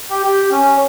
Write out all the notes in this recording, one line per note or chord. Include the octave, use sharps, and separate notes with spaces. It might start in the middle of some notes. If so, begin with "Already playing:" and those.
G4
G4
C#4